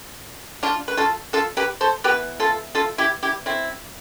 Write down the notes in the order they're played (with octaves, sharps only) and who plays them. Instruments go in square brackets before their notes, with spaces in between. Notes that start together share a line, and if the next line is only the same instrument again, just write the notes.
[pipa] D4 F4
B4
F4 A4
F4 A4
G4 B4
A4 C5
E3 B3 G4 B4
F4 A4
F4 A4
E4 G4
E4 G4
C4 E4